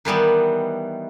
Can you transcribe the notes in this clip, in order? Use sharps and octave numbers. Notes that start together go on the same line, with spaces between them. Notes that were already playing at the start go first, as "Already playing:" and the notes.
D#3 E3 G3 B3